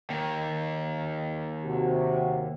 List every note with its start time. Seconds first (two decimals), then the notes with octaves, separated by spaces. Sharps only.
0.10 D#2 D#3
1.65 C3 F#4